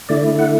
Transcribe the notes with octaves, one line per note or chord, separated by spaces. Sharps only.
D3 A3 E4 D5
F#5